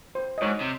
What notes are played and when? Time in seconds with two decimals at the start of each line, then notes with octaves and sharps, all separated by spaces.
0.15 C5
0.38 D#5
0.42 G#2 C#5
0.61 C3